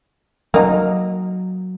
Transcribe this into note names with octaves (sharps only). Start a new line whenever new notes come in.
F#3 A#3 D#4